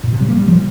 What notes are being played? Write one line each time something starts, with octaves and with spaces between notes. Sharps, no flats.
A#2
C3
G3
A#3
G3
F3